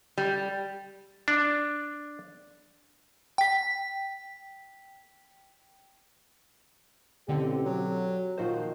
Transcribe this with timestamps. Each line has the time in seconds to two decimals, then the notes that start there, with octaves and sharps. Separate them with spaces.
0.18 G3
1.28 D4
3.38 G5 B6
7.28 A1 B2 D3 C4 G4
7.66 F#3
8.38 A#2 D#3 F3 F#4 C5